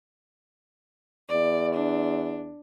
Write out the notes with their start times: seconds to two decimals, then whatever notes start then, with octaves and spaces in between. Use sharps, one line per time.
1.31 E2 D5
1.75 D4